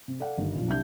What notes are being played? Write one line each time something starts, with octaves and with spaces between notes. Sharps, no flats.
C3
A4 D5 F5 F#5
G1 G2 D#3 G3
B1 F2 A#2
C2 D4 E5 G6